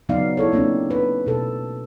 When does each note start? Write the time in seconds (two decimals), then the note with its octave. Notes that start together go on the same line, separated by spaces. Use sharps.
0.09 C#3 F#3 B3 D#4 D5 F5
0.37 E4 A4 C#5
0.52 A#3 C4 D4 D#4
0.90 B4
1.26 B2 A4